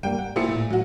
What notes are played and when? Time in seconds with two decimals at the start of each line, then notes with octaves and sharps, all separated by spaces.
0.03 G2 G3 A#3 G5
0.19 F#5
0.36 A#2 E4 G4 A4 C5 C#7
0.49 A2
0.70 F#3 F#4